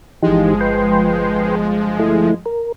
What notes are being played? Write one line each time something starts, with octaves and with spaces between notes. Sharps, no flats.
G1 E3 F3 G#3 D#4 G4
B4 G5 C6
A3 E4
A#4